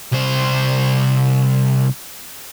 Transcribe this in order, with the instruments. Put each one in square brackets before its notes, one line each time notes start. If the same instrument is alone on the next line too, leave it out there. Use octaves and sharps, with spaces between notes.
[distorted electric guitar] C2 C5